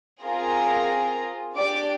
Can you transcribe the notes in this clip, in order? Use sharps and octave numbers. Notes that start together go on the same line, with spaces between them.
C4 F4 G#4 A#4 A#5
D4 G4 D5 D6